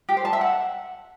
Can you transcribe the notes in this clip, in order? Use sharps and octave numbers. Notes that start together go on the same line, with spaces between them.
G4
C5
A5
E5
F#5